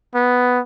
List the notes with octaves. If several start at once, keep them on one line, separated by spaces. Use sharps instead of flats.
B3